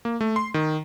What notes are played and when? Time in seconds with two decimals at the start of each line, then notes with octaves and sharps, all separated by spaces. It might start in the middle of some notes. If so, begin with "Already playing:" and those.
0.05 A#3
0.21 A3
0.36 C6
0.54 D#3